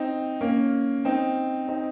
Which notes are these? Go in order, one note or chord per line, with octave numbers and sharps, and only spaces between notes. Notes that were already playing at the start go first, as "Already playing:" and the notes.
Already playing: C4 D#4
A#3 C#4
C4 D#4
C4 D#4